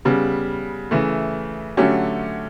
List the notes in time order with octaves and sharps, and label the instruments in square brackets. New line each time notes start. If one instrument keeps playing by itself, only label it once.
[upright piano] C#3 G3 B3
C#3 E3 A3
D3 F#3 A3 C#4 G4